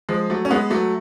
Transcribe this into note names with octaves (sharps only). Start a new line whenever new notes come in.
F3 G#3
F#3 A3
C#4
G#3 B3
F#3 A3